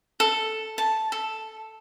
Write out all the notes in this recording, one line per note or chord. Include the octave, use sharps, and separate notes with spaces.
A4
A5
A4